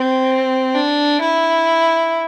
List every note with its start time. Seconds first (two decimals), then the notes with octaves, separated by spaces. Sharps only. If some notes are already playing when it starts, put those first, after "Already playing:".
Already playing: C4
0.75 D4
1.21 E4